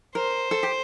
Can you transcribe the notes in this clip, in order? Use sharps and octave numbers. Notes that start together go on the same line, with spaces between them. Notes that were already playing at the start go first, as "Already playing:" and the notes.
A#4 C5
A4
G4